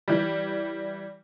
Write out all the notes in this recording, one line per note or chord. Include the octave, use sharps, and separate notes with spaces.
E3 G3